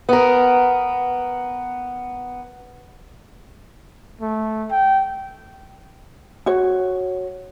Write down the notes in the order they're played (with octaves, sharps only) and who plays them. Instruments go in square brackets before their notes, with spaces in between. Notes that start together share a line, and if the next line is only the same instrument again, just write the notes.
[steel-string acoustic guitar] B3 A#4
[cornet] A3
G5
[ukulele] F#4 C#5